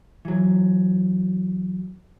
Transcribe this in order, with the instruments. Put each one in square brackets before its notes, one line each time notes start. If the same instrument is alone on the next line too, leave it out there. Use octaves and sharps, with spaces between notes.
[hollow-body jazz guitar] E3 F#3